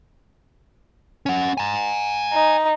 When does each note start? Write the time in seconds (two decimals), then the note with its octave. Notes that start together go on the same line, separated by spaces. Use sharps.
1.26 C#4 F#5
1.58 G#5 A#5
2.33 D#4